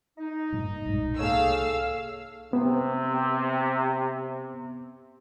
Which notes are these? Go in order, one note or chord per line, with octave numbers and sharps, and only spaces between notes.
D#4
G2 A#2
B1 G#2
C2 A#3 G#4 A4 C#5 F5 E6
C3 B3